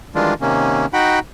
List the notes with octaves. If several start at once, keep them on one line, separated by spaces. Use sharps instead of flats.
D#3 E3 G3 G#3 D4 F4
C3 D#3 A#3 C#4
D#4 F#4 F#5 G5 B5